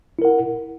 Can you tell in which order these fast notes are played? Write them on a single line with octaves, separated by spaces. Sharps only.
E4 A#4 F#5